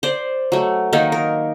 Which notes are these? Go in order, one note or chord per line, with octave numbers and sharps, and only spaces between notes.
C5 D5
F#3 A3
D#3 A#3 D#4
A#4